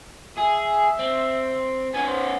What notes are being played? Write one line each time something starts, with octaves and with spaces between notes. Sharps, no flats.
G#4 E5
C4
B3 C#4 G#5
C5